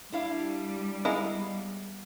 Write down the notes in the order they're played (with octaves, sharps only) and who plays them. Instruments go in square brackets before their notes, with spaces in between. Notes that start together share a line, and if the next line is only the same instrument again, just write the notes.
[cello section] G3 [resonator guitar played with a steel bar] D4 E4 F5
[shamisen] G#3 D#4 E4 [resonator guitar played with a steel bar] B3 F5